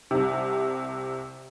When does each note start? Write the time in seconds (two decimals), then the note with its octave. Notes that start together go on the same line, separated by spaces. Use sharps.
0.11 C2 C3